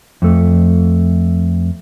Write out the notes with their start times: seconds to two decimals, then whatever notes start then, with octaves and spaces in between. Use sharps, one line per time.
0.22 F2 A3